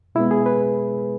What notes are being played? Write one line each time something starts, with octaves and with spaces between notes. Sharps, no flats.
B2 G#3 B3 E4
G#4
B4